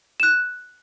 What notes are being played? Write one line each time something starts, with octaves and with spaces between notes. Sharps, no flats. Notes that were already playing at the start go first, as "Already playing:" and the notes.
F#6 E7